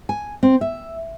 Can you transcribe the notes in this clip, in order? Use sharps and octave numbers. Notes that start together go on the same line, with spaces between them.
G#5
C4
E5